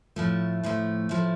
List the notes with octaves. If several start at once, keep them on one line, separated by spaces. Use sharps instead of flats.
A2 F3 A3
A2 F3 A3
A2 F3 A3